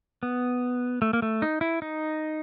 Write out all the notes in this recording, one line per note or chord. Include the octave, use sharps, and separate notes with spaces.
B3
A3
A#3
A3
D#4
E4
D#4